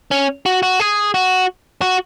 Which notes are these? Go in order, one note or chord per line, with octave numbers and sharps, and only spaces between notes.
C#4
F#4
F#4
G#4
F#4
F#4